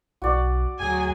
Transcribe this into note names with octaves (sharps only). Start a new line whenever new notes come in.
B1 F#4 D5
D2 F#3 G#4 G#5